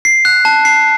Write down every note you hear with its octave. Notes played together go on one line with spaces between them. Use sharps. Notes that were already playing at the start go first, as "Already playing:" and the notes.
C7
F#6
A5
C7